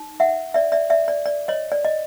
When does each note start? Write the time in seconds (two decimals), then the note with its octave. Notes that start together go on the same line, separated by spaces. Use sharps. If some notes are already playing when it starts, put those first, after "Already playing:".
Already playing: D#4
0.20 E5 F#5
0.54 D5 E5
0.72 D5 E5
0.90 D5 E5
1.08 D5
1.26 D5
1.48 C#5 D#5
1.72 D5
1.84 D#5